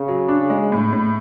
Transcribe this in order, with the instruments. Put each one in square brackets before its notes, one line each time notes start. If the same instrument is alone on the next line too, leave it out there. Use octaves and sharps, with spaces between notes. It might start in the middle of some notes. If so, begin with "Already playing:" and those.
Already playing: [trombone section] C#3
[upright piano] F#3
D4
G#3
A2
A2